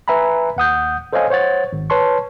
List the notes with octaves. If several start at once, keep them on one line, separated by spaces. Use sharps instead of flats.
B4 E5 G#5 A#5 B5
D#2 F#5 D#6 G6
A4 C5 C#5 D#5 F5 G#5
C5 C#5 F#5 A6
G#1
B4 C#5 A5 C6 C#6